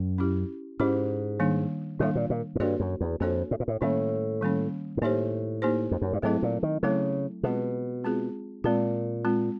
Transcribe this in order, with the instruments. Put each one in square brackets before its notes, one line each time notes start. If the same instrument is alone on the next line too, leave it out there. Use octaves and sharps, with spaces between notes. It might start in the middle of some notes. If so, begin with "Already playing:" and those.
Already playing: [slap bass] F#2
[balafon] C#4 E4 G4
[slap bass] G#2 [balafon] C#4 E4 G4
[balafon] D#3 G3 A#3 D4
[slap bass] A2 [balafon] D#3 G3 A#3 D4
[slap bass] A#2
A#2
G#2
[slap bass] G2 [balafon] A#3 D4 F#4 A4 C#5
[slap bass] F#2
E2
[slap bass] F2 [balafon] A#3 D4 F#4 A4 C#5
[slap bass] A2
A#2
A2
[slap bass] A2 [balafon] D#3 G3 A#3 C#4
[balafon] D#3 G3 A#3 C#4
[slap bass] G#2
[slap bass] A2 [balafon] A#3 D#4 G4 C5
[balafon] A#3 D#4 G4 C5
[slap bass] F2
F#2
G2
[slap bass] G#2 [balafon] F#3 A3 C4 E4 A4
[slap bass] A#2
D#3
[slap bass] C#3 [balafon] F#3 A3 C4 E4 A4
[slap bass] B2 [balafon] G#3 C4 F4 G#4
[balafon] G#3 C4 F4 G#4
[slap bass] A#2 [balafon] G#3 C4 F4
[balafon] G#3 C4 F4